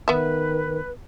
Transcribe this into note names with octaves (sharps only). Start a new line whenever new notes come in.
D#3 B3 B4 E5